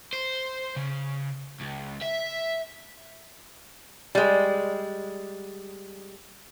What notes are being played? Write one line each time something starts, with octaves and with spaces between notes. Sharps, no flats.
C5
C#3
C#2
E5
G3 G#3